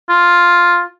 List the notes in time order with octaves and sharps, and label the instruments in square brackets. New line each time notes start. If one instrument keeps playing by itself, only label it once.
[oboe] F4